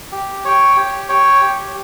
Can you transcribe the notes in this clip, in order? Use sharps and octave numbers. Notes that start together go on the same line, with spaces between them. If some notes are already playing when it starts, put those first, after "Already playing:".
G4
C#5 G5
G4
C#5 G5
G4